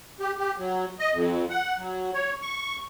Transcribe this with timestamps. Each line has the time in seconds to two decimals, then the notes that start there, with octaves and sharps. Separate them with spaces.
0.20 G4
0.38 G4
0.58 F#3
0.99 D#5
1.13 F2
1.50 F#5
1.78 F#3
2.14 C#5
2.42 C#6